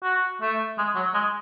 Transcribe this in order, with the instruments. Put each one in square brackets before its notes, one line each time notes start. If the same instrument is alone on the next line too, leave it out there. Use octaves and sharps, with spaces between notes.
[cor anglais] F#4
A3
G#3
F#3
G#3